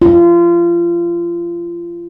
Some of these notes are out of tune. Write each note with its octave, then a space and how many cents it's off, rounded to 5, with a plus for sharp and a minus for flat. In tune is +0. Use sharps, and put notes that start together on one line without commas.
F4 -30